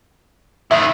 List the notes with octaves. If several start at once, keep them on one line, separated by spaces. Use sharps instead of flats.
D#3 E4 E5